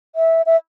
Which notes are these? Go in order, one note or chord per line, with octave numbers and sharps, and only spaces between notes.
E5
E5